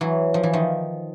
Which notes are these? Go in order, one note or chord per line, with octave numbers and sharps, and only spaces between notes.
E3 F#3
F3
E3
D#3 F3